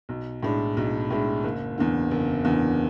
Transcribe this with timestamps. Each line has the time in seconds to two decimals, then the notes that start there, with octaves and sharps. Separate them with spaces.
0.09 B1
0.43 A2 G#3 D4
0.77 B1
1.10 A2 G#3 D4
1.44 F#1
1.78 E2 D3
2.11 F#1
2.45 E2 D3